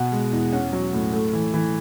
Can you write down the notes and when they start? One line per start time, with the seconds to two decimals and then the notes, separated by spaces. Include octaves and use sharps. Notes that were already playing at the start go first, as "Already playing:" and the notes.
Already playing: B2 F#5
0.12 G#3
0.32 E2
0.52 C#4 F#5
0.73 F#3
0.93 A2
1.13 A3
1.33 E3
1.53 E3